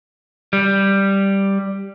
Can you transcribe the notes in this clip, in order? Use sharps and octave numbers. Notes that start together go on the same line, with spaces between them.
G3